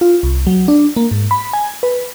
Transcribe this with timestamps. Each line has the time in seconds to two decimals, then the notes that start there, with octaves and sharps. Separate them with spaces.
0.01 F4
0.23 C2
0.47 F#3
0.68 D4
0.96 A#3
1.11 G#2
1.31 B5
1.53 G#5
1.83 B4